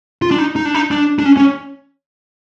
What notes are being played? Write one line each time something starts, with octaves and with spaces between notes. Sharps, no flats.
F4
D4
D#4
D#4
D4
D#4
D4
D4
C#4
C#4